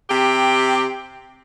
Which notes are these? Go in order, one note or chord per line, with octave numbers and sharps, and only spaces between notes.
C3 G4